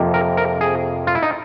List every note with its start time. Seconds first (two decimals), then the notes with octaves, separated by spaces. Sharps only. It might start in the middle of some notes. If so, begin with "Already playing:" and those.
Already playing: F2 C3 F3 A#3
0.14 A#4
0.37 A#4
0.61 G#4
1.07 F4
1.15 E4
1.23 D#4